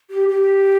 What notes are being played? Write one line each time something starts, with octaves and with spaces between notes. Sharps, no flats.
G4
G4